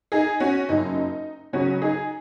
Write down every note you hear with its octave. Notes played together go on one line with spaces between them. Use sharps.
D#4 G#4
C#4 F#4
F#1 F#2 F#3 D#4
C#2 C#3 F#3 C#4 F#4
D#4 G#4